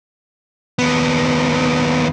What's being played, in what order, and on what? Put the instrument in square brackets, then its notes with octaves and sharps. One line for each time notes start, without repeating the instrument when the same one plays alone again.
[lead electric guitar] D#2 B3